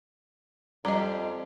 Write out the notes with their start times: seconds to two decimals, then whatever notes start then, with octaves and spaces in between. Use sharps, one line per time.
0.85 F2 G3 D#5 A#5